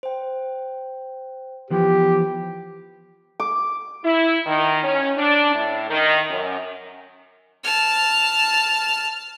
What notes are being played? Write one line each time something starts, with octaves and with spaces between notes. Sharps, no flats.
C5 G5
E3 F3 B3 G4
D6
E4
D#3
C#4
D4
A2
D#3
F#2
A5 F6